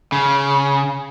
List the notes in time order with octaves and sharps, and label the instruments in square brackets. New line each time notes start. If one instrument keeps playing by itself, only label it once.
[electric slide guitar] C#3